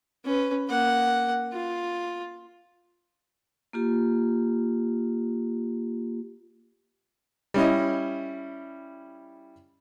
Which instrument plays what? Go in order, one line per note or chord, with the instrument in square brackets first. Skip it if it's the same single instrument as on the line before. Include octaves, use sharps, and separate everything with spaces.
[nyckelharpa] C#4 B4
A#3 F#5
F4
[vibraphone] A#3 F4 G4
[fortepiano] G3 C#4 E4 D#5